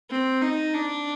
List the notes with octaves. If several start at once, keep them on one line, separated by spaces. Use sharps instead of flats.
C4
D#4
D4